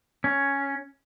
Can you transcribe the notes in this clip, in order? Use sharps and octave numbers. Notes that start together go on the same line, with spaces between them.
C#4